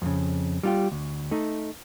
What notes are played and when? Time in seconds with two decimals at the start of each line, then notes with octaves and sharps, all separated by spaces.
0.02 F2 A2 C#3
0.63 G3 F4 G4
0.92 D2
1.31 A3 D#4